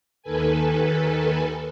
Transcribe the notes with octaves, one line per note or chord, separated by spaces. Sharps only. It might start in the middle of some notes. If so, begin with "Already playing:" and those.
D#2 D#3 A4 B4 G#5